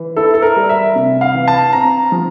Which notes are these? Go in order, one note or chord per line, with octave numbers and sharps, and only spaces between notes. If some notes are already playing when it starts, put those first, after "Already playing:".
Already playing: E3
E4 A4
A4
A#4
G3
E5
C3
F5
E3
A5
C4 A#5
F3